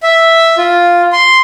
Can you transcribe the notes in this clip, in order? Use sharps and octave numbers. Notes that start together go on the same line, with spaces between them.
E5
F4
C6